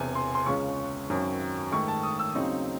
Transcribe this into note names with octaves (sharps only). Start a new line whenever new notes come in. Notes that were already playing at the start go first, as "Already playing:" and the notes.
Already playing: E1 E2 C3 G#5
C6
C6
C#2 C#3 G#3 C#4 C#6
G#1 F#2 D#3 F#3
G#2 D#3 A3 C#6
A5
D#6
E6
D#2 C#3 F#3 C4 D#4